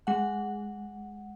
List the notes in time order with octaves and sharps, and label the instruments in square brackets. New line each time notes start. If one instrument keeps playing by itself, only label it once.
[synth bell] G#3 F#5